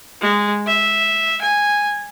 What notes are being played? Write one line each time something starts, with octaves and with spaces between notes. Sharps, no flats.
G#3
E5
G#5